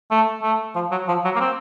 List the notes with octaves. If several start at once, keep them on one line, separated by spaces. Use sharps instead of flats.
A3
A3
F3
F#3
F3
F#3
A#3
C4